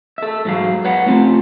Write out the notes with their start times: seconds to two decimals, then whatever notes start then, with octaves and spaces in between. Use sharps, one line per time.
0.18 A4 E5
0.45 G#2 F#3 F5
0.84 B4 C#5 F#5
1.06 A3 C4 F4